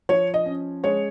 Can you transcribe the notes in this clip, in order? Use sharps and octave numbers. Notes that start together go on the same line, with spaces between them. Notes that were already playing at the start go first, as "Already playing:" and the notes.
F3 C#5
D#5
C#4
G#3 C#5